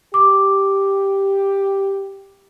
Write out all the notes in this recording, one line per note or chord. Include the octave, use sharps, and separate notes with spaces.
G4 D6